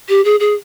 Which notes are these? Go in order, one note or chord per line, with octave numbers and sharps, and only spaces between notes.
G4
G#4
G#4